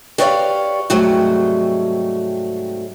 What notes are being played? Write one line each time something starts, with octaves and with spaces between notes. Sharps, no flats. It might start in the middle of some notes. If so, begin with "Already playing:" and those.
G4 B4 C#5 D5 E5 F5
G#2 C3 F#3 G3 A3